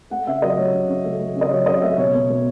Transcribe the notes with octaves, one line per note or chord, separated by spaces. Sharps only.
A3 F#5
C#3 E5
F#3 D#5
A3 C#5
C#3
C#3
A3
A3
C#3
D#5
F#3 C#5
C#3 D#5
A3 E5
B2 C#5
B2
B2